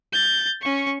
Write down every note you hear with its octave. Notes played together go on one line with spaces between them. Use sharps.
G6 A6
C#4 C#6